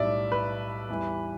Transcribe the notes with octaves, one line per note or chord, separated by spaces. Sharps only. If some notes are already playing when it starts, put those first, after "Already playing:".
Already playing: B1 A2 G3 D5 E5
B4
E2 E3 G3